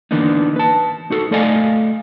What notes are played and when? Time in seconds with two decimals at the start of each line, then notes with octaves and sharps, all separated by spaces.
0.11 D3 E3 A#3 B3 D4 D#4
0.56 B4 A5
1.10 D#4 F#4 A4
1.31 A3 A4 D5 D#5 F5 G#5